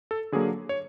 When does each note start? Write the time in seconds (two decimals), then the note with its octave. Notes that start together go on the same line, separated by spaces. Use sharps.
0.11 A4
0.32 D3 F#3 A#3 G#4
0.69 C#5